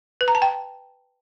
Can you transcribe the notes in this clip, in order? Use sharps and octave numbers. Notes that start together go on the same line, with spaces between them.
B4
A#5
A5
G5